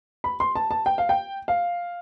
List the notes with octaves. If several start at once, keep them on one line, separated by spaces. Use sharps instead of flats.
B5
C6
A5
A5
G5
F5
G5
F5